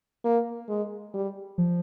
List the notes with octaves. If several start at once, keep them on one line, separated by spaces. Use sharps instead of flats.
A#3
G#3
G3
F3